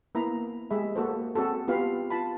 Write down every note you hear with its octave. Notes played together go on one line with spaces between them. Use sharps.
A#3 B3 E4 A#5 B5
G#3 G4 G#4 E5 B5
A#3 F#4 A4 C5
C4 F#4 G#4 A4
B3 F4 G4 B4 F5 B5
F4 A5 B5